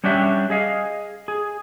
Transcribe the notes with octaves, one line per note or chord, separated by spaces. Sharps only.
G3 C#4 D4 F#4 G4 E5
G#4 D#5 F5
G#4